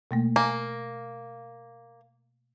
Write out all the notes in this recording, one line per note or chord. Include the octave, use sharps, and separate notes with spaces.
B2 A3 A#3
A#3 G#5 A#5